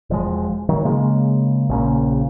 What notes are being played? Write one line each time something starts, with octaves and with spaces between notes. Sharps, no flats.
E1 F3 G#3
D#3 F#3
C#3 G#3 A#3
A#1 C#3 A#3